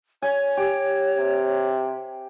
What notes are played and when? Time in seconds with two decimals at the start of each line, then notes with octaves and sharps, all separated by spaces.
0.22 C#5 G#5
0.57 G4
1.18 C3